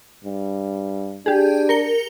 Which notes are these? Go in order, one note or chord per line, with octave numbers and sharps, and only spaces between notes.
G2
D4 G4 G#4
A#4 C#7 G7